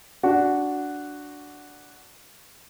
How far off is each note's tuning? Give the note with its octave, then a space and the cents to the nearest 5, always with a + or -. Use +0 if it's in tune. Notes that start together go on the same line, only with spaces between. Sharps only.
D4 -10 F#4 +0